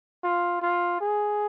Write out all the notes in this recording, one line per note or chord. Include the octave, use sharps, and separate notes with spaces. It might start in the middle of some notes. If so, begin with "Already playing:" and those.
F4
F4
G#4